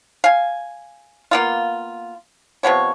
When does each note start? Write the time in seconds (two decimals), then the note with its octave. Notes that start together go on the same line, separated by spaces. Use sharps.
0.24 F5 G#5
1.31 A#3 B3 F4
2.63 C3 F3 B3 C#5